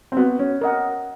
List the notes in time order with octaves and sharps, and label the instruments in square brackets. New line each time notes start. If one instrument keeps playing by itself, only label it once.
[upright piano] C4
[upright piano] B3 [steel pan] F#4
[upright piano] C#4
[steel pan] A#4 D#5 F#5